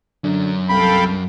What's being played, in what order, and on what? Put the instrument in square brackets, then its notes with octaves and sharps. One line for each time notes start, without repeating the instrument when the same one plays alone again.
[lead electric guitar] F#2 [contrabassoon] D3
[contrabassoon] C2 [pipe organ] A4 F5 G5 [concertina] B5